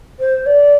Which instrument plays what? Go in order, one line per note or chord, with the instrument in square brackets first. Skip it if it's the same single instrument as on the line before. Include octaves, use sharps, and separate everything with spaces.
[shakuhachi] C5
D5